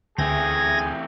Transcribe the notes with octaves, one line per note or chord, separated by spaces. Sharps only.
D2 E3 A3 C4 G#4 G#5 G#6 A#6